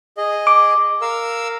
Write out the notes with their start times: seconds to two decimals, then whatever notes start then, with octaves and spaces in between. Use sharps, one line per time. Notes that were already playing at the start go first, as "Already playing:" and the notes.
0.18 G#4 D#5
0.47 D6
1.02 A#4 F5 E6